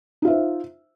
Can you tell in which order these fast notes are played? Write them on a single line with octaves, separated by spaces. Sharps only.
D#4 F4 E5 C5